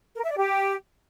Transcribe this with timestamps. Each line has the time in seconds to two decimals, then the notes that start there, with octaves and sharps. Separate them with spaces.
0.15 A#4
0.22 E5
0.29 D5
0.36 G4